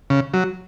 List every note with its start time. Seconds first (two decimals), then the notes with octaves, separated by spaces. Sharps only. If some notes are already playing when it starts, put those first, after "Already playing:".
0.10 C#3
0.34 F#3